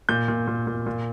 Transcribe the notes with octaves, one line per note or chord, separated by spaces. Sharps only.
A#2 G6
A#2
A#2
A#2
A#2